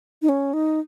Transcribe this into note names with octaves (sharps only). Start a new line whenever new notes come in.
D#4
C#4
D#4